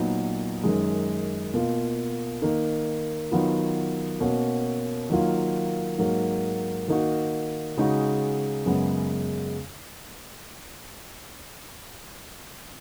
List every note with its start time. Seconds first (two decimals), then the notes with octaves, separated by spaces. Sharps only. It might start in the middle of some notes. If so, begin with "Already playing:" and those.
Already playing: A#2 F#3 B3 D#4
0.64 F#2 D#3 G#3
1.54 B2 A#3 F4
2.42 D#3 A#3 D#4
3.31 D#3 F#3 B3 F4
4.21 B2 A#3 C#4 F#4
5.10 D#3 F#3 A#3 F4
5.98 G#2 F#3 A#3
6.88 D#3 A#3 D#4 F#4
7.78 C#3 G#3 D#4 F#4
8.66 F#2 C#3 G#3 B3